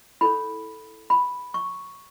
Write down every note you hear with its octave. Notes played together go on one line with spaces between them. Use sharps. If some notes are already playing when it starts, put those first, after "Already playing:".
E4 A4 C#5 B5
B5
C#6